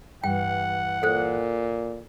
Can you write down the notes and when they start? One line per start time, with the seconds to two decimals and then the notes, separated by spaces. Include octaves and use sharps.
0.24 G2 E3 F#5 G5
1.03 A#2 A4 C5